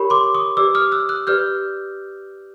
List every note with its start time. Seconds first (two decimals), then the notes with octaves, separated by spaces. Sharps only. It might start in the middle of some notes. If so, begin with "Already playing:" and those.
Already playing: G4 A#4 C#5 B5 C#6
0.10 C6 D6
0.34 C#6 D#6
0.57 G4 B4 D5 D6 E6
0.75 D#6 F6
0.92 E6 F#6
1.09 E6 F#6
1.27 G4 B4 D5 F6 G6